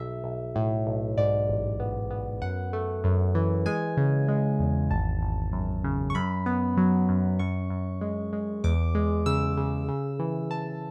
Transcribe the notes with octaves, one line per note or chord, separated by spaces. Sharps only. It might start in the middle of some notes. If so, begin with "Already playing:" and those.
Already playing: B1 E5
B1
A2
B1
G#2 D5
A1
B3
B3
F#2 F#5
A3
F#2
E3
G#3 G#5
C#3
G#3
E2
G#1 A5
G#1
F#2
C#3
C#6
F#2 B5
B3
F#3
F#2
F#2 C#6
F#2
G#3
G#3
E2 D6
G#3
C#3 E6
C#3
C#3
E3
E3 A5